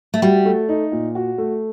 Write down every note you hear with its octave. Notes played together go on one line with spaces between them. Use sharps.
A3
G3 F#4
A3
D#4
A#2
F#4
A3